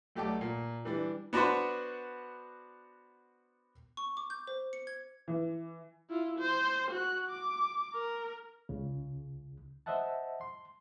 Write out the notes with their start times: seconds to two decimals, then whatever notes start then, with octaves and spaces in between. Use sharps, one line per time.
0.15 B1 A3 G4 D5 A5
0.41 A#2
0.85 E3 G3 D4
1.33 B3 D4 F#4 B4 C5
3.97 C#6
4.17 D6
4.30 G6
4.47 C5
4.73 C#7
4.87 G#6
5.28 E3
6.10 E4 F4
6.39 C5
6.91 F#4 F#6
7.30 D6
7.94 A#4
8.69 C#2 C#3
9.86 C5 D#5 E5 F#5 A5
10.41 C6